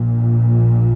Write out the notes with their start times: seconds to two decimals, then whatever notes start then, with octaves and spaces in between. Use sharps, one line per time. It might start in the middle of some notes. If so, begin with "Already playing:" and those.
Already playing: A#1 A#2